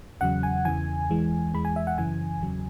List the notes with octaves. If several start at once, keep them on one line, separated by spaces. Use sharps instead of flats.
E2 C#3 F#3 F#5
G#5
E2 C#3 E3 G#5
E2 E3 G#3
E2 E3 G#3 B5
G#5
E5
F#5
F#2 C#3 E3 G#5
E2 C#3 F#3